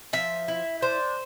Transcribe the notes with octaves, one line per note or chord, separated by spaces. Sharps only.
F3 E5
E4
D4 C5